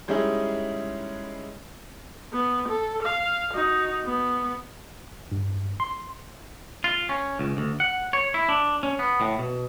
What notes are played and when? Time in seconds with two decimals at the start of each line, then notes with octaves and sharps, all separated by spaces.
0.08 G3 G#3 C#4 D#4 E4 G#4
2.33 B3
2.69 A4
3.03 F5
3.54 D#4 F#4
4.05 B3
5.32 G2
5.80 C6
6.84 F4
7.09 C#4
7.39 C#2
7.57 D2
7.80 F#5
8.13 C#5
8.34 E4
8.49 D4
8.83 C#4
8.99 B3
9.21 A2
9.39 B2